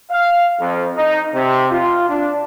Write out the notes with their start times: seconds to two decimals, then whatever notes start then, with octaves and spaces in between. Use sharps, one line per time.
0.11 F5
0.60 F2
0.96 D#4
1.34 C3
1.72 F4
2.09 D4